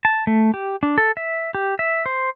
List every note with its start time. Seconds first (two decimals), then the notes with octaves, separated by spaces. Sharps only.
0.05 A5
0.27 A3
0.54 G4
0.83 D4
0.98 A4
1.17 E5
1.55 G4
1.79 E5
2.06 C5